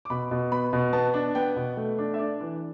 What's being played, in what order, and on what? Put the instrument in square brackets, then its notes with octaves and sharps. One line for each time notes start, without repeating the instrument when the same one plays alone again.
[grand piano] D6
B2 B5
B2
B3 B5
B2
B3 A5
D4
B3 G5
B2
A3
D4
E5
D4 D5
E3